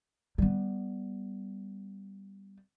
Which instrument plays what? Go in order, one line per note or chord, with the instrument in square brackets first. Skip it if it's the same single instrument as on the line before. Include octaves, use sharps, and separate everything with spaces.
[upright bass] G3 B3